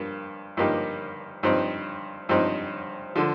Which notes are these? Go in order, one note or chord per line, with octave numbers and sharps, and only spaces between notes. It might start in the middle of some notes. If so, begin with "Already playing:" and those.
Already playing: G2 F3 A#3
G2 F3 A#3 D#4 G4
G2 F3 C4 D#4
G2 F3 C4 D#4
D3 F3